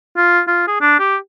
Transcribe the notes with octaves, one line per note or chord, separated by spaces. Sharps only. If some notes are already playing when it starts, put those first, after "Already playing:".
F4
F4
G#4
D4
G4